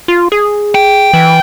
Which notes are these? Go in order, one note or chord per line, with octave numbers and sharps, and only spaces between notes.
F4
G#4
G5
E3